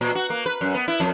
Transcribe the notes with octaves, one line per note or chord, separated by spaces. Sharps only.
A#2
F#4
A#3
B4
F#2
B3
E4
F2